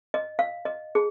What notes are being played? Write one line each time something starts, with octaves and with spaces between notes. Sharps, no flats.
D#5
F5
D#5
G#4